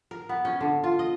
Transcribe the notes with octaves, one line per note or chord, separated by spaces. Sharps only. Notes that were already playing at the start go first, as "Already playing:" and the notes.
A#4
B3
C#4
D3
F4
D#5